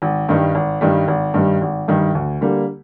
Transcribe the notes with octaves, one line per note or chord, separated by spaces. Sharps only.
G#1
G2 D#3 G3
G#1
G2 D#3 G3
G#1
G2 D#3 G3
G#1
G2 D#3 G3
D2
D3 G3 A#3